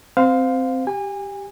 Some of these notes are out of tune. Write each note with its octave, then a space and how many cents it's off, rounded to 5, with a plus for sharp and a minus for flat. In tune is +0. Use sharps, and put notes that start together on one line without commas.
C4 +0 C5 -20 F5 +15
G4 +0 G#5 -30